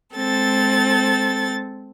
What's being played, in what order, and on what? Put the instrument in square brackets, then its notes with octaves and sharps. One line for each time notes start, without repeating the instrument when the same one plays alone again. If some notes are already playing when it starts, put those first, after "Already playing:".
[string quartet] G#3 C4 A4 A6